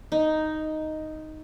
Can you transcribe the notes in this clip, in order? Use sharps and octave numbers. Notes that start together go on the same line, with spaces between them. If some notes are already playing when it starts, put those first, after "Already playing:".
D#4